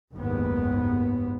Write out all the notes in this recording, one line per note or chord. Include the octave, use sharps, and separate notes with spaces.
F#1 D#2 G#2 B3